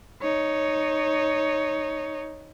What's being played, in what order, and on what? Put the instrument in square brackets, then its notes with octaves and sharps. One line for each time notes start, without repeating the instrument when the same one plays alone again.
[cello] D#4 C#5